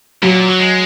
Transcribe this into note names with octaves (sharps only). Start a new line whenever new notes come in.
A#2 F#3
F#3
G#3